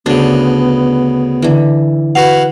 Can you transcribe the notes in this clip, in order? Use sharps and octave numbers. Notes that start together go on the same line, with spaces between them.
D2 C#3 B3 D4
D3 E3
E4 F#4 B4 F5 F#5